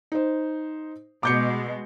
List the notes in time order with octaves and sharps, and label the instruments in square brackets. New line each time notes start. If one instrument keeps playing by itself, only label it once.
[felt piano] D#4 C5
[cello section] B2 G#3 [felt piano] D6 G6 C#7